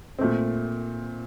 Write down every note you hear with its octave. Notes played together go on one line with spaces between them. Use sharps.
A#2 A3 C4